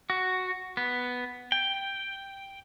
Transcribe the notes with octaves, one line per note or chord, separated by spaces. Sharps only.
F#4
B3
G5